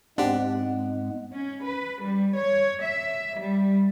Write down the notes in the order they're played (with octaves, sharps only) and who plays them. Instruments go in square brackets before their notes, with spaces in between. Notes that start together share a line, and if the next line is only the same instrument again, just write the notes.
[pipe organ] G#2 G#3 B3 [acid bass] C4 [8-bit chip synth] D4 G4 [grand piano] F#5
[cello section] C#4
B4
G3
C#5
E5
G3